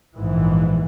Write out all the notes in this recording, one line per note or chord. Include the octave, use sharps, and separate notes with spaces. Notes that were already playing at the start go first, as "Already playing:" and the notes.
A#1 G#2 E3